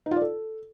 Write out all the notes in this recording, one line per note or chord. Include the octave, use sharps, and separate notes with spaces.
D#4
F4
D5
A4